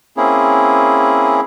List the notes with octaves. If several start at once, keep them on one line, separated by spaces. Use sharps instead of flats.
A#3 C4 C#4 E4 G#4